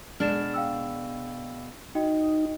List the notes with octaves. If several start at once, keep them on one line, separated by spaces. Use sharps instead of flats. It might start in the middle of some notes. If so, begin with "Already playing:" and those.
B2 G#3 D4 F6 A6 E7
F5 G5 E6
D#4 F#4 D#5 G5